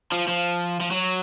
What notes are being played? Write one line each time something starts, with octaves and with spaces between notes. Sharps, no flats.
F3
F3
F3
F#3